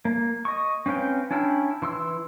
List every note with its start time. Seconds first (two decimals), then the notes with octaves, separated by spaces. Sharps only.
0.05 A#3
0.45 D#5 C#6
0.86 C4 C#4 B4 F5 G5
1.31 C#4 D4 E4 G5 F6
1.82 E3 C6 E6